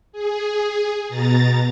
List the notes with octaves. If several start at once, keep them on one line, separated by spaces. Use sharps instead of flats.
G#4
B2 A#5 A6